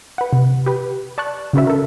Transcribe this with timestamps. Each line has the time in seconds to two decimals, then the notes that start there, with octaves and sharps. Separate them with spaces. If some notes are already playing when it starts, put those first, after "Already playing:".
0.18 B4 F#5
0.33 C3
0.66 G4 B4
1.18 D5 A5 C#6 F#6
1.53 C#3 C#4 F#4 B4 E5
1.67 A4 A#4